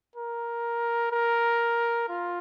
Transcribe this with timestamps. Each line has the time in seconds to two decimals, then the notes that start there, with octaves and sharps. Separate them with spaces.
0.16 A#4
1.12 A#4
2.09 F4